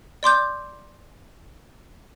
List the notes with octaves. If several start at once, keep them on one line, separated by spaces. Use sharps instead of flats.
D5 C6 D6 G6